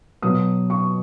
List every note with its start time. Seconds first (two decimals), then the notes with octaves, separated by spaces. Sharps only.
0.22 B2 F#3 D#6
0.70 C#6